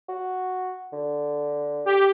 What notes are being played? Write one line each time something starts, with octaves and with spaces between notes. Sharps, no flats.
F#4
D3
G4